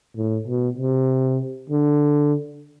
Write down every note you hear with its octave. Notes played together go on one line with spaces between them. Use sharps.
A2
B2
C3
D3